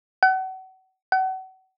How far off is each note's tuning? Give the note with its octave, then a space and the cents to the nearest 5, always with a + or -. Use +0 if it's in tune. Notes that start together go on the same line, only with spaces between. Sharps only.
F#5 +35
F#5 +35